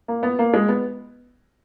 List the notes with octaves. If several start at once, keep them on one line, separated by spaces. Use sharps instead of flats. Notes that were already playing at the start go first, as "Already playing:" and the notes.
A#3
B3
A#3
G#3
B3